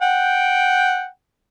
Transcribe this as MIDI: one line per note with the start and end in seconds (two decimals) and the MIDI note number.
0.02 1.07 78
0.02 1.07 79